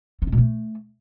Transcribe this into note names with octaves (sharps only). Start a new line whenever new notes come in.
C4
C3
B2
A3